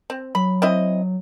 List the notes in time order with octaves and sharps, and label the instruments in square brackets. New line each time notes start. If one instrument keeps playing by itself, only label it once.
[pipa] C4
[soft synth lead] F#3 [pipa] B5
[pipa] C4 E4 D#5